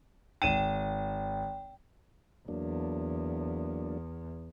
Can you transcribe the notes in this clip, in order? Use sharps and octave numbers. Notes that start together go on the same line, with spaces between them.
G#1 G5 D#7 E7
E2 F#3 A#3 D4